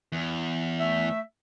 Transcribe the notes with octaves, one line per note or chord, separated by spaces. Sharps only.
E2
A3 E5